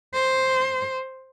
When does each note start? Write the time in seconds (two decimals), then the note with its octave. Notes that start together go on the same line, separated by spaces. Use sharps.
0.14 C5